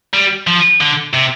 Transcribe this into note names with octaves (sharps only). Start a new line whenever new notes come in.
G3
F3
D3
C3